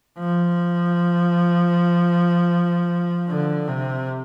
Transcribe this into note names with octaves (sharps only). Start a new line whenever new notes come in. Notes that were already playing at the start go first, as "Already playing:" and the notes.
F3
D3
C3